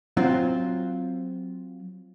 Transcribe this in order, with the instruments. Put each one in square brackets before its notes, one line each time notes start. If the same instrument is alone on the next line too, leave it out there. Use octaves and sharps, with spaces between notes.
[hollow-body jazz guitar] F#3 C4 F4